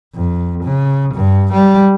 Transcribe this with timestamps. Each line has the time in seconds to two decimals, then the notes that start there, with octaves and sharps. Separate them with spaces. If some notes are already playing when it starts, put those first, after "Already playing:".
0.14 F2
0.64 C#3
1.14 G2
1.52 G3